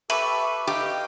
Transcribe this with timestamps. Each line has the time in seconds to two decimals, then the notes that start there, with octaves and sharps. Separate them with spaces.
0.10 G4 A4 B4 E5 C#6 D6
0.67 D#4 G4 F5 G5